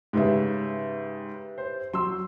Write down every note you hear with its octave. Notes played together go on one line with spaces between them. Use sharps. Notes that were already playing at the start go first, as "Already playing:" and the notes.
G#2 C#3 G4 B4 E5
C5
F#3 C6 E6